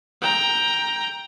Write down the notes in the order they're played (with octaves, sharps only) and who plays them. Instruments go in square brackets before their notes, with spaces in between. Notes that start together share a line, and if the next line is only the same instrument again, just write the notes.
[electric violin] G5 A#5